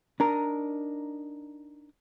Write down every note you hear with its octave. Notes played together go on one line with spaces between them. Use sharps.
D4 D#4 A#4